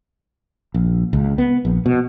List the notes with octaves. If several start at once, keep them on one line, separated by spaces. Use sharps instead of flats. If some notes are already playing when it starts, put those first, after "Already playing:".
A#1
C#2
B3
A#1
B2